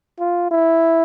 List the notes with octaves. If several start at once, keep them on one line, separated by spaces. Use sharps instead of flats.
F4
E4